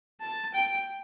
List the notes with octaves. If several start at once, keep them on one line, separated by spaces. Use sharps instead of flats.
A5
G5